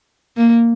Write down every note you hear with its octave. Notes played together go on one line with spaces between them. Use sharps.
A#3